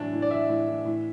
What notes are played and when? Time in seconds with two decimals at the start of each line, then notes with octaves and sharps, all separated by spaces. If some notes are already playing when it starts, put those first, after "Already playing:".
Already playing: A2 E3 F#3 D4
0.12 A2
0.22 D5
0.31 E3 E5
0.49 A2
0.67 E3
0.85 A2